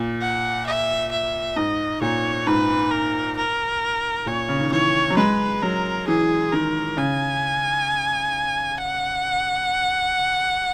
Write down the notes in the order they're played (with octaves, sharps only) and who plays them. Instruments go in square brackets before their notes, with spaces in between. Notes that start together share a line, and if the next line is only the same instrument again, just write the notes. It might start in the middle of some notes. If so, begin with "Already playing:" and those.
Already playing: [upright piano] A#2
[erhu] F#5
E5
E5
[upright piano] G#2 [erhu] D#5
[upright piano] A#2 [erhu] C#5
[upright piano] G#2 [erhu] B4
[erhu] A#4
A#4
[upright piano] A#2 [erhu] C#5
[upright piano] C#3
D#3
[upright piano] E3 [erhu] C#5
[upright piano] F#3
[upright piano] G#3 [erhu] B4
[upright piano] F#3 [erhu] A#4
[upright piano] E3 [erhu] G#4
[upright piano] D#3 [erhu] A#4
[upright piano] C#3 [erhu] G#5
[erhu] F#5